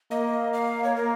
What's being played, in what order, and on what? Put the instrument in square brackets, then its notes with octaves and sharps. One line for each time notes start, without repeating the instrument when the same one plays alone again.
[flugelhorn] A#3 [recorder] D#5
[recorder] F5
C#5
A#4